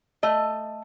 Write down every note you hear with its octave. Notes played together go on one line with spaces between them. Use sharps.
A3 D#5